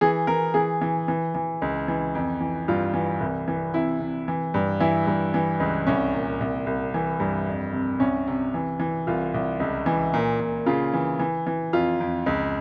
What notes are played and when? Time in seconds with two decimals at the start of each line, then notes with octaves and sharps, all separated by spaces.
0.01 E3 G#4
0.27 E3 A#4
0.54 E3 G#4
0.81 E3
1.08 E3
1.35 E3
1.62 C#2
1.88 E3
2.15 F2
2.41 E3
2.68 G2 F4
2.94 E3
3.21 C2
3.48 E3
3.74 C3 E4
4.00 C3
4.28 E3
4.54 G2
4.80 E3 E4
5.07 G2
5.34 E3
5.60 C#2
5.87 C2 C#4
6.14 A#2
6.40 C2
6.66 C2
6.94 E3
7.20 G2
7.47 F2
7.73 C3
8.00 C2 C#4
8.27 C3
8.54 E3
8.80 E3
9.07 C2 F4
9.34 C2
9.60 C#2
9.86 E3
10.14 A#2
10.40 A#2
10.66 C#3 F4
10.94 E3
11.19 E3
11.47 E3
11.73 F2 F4
12.00 F2
12.26 C#2